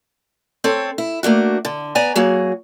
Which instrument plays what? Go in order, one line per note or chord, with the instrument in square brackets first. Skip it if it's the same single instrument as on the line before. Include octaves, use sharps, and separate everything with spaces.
[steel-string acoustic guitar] C4 A4 C#5
E4
A3 A#3 D4 F#4
D3
B3 D5 G#5 A#5
F#3 A#3 F#4 G#4